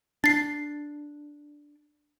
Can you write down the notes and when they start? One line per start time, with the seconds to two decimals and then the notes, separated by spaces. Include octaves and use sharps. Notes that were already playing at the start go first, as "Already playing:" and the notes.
0.24 D4 A6 C7